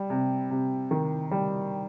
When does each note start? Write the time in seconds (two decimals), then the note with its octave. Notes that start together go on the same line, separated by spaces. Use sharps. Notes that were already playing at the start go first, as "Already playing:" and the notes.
Already playing: G3
0.10 C3
0.50 C3
0.91 D#3
1.31 G3